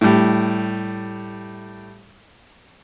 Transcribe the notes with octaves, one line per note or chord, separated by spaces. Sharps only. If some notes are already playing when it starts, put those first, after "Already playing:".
A2 G3